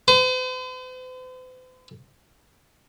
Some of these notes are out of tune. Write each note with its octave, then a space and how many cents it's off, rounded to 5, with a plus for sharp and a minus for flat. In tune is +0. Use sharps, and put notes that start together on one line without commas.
C5 -45